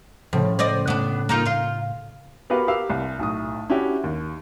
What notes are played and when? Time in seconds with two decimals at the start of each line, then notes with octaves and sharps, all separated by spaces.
0.33 A2 C#3 F3
0.59 C5 D5 D#5
0.88 A2 B3 D4
1.29 A#3 D#4 F4
1.45 F4 F5
2.50 B3 F#4 G4 A#4 B4 F5
2.68 G4 A#4 F5 E6
2.90 C2
3.19 B1 A2 D#6
3.70 C#4 D4 E4 F#4 G4
4.04 D#2